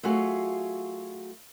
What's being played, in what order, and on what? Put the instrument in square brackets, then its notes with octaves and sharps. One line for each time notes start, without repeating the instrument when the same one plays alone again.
[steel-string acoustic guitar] F#3 A3 F4 F#4 G#4